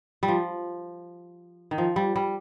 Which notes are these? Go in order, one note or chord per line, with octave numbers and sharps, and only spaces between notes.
G3
F3
D#3
F3
G3
G3